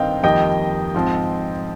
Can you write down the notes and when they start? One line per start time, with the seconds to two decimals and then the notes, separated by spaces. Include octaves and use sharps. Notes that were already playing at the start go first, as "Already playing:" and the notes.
Already playing: G2 D#3 C4 D#5 F5 G5
0.23 F2 D#3 G3 A#3 D#5 G5
0.94 G#2 F3 C4